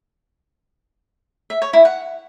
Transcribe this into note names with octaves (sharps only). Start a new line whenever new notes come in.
E5
C#5
E4
F#5